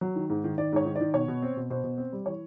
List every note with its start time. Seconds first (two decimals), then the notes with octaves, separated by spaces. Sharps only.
0.01 F#3
0.16 D#3
0.30 G#2
0.44 D#3
0.58 D#3 D5
0.72 G#2 C#5
0.85 D#3
0.96 D5
1.01 D#3
1.14 B2 C#5
1.28 B2
1.42 C4
1.57 B2
1.70 B2 C5
1.84 B2
1.98 C4
2.13 G3
2.26 E3 C#5